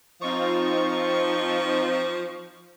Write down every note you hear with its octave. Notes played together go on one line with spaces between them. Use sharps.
F3 C4 D#4 F4 C#6